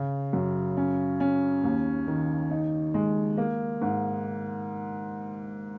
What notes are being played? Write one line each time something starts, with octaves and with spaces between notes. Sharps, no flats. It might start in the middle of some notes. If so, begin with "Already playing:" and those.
Already playing: C#3
F#2
C#4
C#4
D#2
D#3
D#4
G#3
A#3
G#2